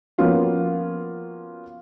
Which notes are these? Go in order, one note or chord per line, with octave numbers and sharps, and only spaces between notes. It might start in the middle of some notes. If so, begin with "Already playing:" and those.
F3 A#3 B3 C#4 F4 F#4